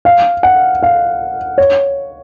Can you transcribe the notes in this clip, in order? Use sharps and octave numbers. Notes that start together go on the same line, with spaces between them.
F5
F#5
F5
C#5